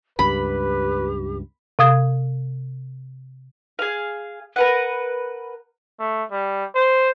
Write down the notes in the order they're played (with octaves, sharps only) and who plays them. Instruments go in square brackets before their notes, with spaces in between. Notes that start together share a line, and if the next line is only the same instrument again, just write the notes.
[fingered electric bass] C#2 G2 [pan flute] G4 [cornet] B4 [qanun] B5
[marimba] C3 F5 D#6 G#6
[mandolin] G#4 F5
A#4 B4 F#5
[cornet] A3
G3
C5